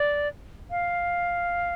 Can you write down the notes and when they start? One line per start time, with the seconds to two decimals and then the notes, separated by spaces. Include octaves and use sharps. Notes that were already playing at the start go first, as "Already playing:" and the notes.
Already playing: D5
0.71 F5